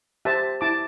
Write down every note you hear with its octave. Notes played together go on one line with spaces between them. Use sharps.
G4 C5 E5 A5
E4 A5 D6